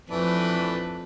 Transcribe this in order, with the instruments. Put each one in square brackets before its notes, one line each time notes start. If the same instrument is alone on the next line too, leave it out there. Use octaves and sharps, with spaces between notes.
[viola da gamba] F2 B4 [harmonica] E3 A3 D4